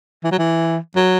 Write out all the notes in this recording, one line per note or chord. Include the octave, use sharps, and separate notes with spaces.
E3
F#3
E3
F#3